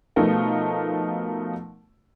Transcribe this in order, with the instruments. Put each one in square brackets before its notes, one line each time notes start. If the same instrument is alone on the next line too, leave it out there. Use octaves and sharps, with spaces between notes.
[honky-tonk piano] B2 F3 A3 D#4 A#4